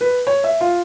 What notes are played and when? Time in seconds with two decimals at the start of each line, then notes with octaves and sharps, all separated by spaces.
0.01 B4
0.27 C#5
0.44 E5
0.61 F4